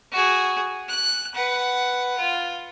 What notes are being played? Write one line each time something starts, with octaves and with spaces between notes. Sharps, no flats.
F#4 G#4
F#6
B4 F#5
F4